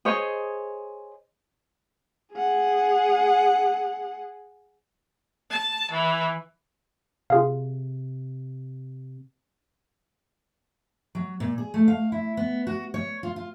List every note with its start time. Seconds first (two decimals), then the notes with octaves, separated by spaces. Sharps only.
0.05 G#4 C5 C#5 D#5
2.34 G#4 F#5
5.50 A5
5.91 E3
7.30 C3 F4 G#4 F5
11.15 F#3
11.40 A#2
11.58 G#4
11.74 A3
11.88 F5
12.12 E4
12.37 B3
12.67 F#4
12.94 C#5
13.23 F4
13.36 F4